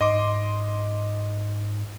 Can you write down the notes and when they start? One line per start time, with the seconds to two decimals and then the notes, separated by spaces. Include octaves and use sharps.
0.01 G#2 D#5 C6 D6